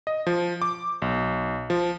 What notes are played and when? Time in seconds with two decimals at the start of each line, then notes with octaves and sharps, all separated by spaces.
0.07 D#5
0.27 F3
0.62 D6
1.02 B1
1.70 F3